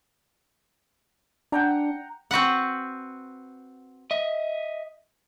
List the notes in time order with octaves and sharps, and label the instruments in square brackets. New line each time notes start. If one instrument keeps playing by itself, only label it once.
[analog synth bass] D4 [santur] F#5 G5 A#5
[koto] C4 F#4 B4 F#5
[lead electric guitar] D#5 E5